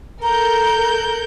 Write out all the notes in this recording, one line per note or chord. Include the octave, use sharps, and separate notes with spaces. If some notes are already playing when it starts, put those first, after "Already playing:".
A4 A#4 A#5 G6